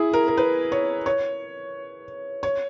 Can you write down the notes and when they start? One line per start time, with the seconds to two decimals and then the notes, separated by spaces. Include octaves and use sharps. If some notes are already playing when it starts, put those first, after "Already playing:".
Already playing: E4 G#4
0.13 A#4
0.28 A#4
0.37 B4
0.72 C#5
1.06 C#5
2.43 C#5